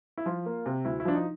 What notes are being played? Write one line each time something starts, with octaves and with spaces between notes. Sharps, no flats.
E4
F3 F4
A#3
C3
D2 E4
E4
F3 D4
D#4